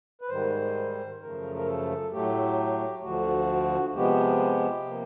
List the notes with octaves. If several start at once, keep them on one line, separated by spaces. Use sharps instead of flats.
B4
G#2 D#3 G3 C5
F#2 C#3 F3 A3 A#4
A#4
A4
A2 F#3 A3 G4
D2 D3 F3 F#4
C3 F3 G#3 B3 G4
C3 F3 A#3